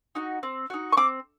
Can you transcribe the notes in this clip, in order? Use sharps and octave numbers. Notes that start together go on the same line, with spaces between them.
D#4 F#4
C4
D#4 F#4
C#6
C4 D6